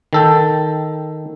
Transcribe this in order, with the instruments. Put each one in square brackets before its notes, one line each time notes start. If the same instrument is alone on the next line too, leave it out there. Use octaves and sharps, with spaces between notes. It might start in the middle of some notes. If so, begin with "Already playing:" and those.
[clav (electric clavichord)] D#3 A4 G5